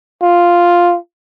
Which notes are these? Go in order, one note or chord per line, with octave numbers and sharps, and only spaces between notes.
F4